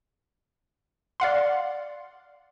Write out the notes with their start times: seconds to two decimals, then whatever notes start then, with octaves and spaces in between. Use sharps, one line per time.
1.20 D5 F5 F#5 C6